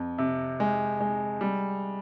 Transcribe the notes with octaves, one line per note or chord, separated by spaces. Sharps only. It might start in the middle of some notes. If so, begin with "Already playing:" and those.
Already playing: F2
C3
G#3
G#3
G3